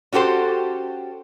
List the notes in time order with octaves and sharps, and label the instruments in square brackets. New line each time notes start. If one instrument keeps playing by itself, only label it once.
[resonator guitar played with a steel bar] C#4 F#4 G4 A4 C5